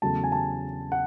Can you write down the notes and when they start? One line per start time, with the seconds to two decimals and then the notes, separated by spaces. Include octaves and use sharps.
0.02 E2 C#3 F#3 A3 A5
0.24 G#5
0.32 A5
0.92 F#5